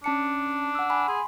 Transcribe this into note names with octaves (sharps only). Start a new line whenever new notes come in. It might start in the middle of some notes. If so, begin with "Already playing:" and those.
C#4 D4 A5 C#7
F#5 E6
G#5 B5
G#4 C6